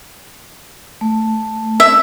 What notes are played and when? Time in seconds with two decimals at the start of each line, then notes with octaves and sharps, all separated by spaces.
1.01 A3
1.80 E5